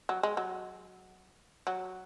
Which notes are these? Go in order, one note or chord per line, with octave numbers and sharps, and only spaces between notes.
F#3
G#3
F#3
F#3